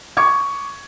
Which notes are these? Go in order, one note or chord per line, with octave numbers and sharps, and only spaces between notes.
C#6 D6 G#6